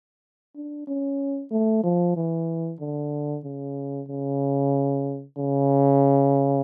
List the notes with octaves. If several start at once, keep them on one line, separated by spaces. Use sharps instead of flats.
D4
C#4
A3
F3
E3
D3
C#3
C#3
C#3